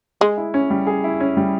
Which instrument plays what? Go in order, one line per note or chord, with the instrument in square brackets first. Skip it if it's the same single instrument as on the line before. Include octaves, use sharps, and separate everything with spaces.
[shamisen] G#3 [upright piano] G#4
[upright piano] E4
C#4
G3
G#4
E4
C#4
G3